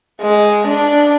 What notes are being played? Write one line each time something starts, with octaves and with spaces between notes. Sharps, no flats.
G#3
D4